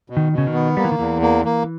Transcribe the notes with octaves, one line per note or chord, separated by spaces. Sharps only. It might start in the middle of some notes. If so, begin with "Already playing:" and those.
B2
D#3
B2
C#3
D#3
B3
G3 A#3
E3
D#3
E2 E3
A#3
A#3